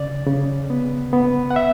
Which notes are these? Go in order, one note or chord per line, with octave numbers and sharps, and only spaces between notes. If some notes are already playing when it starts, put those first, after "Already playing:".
Already playing: C#3 D5
C#3
B3
B3
F#5
E5